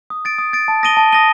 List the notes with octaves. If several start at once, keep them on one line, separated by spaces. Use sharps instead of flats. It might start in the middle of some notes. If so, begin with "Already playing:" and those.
D#6
A6 D7
D#6
A6 D7
A5
D#6 A#6 D#7 G7
A5
D#6 A#6 D#7 G7